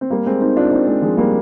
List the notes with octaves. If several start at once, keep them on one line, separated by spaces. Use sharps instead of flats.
C4
G3 A#3
G#3 C4
C4 D#4
D4 F4
C4 D#4
G#3 C4
F3 G#3
G3 A#3